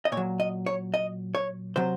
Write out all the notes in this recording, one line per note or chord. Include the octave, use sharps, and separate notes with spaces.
D#5
A#2 C#5
F#3
D#5
C#5
D#5
C#5
C3 F#3 C5